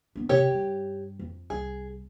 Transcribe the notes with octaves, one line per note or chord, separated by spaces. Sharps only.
B3 D4
C3 G4 C#5
G2
F2
C2 G#4